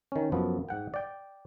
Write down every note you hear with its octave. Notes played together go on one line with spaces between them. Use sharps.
D#3 C#4
F#2 F3 B3
G#2 F#5 G5
D5 G5